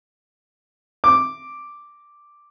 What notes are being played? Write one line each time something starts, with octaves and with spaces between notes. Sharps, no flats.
D6